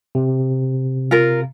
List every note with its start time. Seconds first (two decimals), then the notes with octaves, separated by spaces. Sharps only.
0.15 C3
1.11 F4 A#4